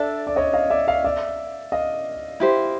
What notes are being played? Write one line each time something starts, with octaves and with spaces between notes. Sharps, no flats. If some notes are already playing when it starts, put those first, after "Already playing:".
Already playing: D4 A4 D5 E5
D5
C#5 D#5
D#5 F5
D5 E5
D#5 F5
D5 E5
D#5 F5
E4 G4 C5